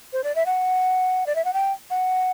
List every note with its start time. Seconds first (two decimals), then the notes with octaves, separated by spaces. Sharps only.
0.13 C5
0.24 D5
0.35 E5
0.46 F#5
1.27 D5
1.35 E5
1.45 F#5
1.53 G5
1.90 F#5